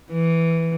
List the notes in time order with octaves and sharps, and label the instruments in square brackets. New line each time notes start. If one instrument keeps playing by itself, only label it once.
[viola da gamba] E3